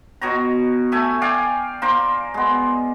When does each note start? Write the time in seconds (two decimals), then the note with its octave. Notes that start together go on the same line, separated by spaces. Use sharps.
0.21 B2 C#5 A#5
0.92 A3 E5 G#5
1.22 D5 F5 G5 G#5
1.82 A#3 A#4 C5
2.34 G#3 B3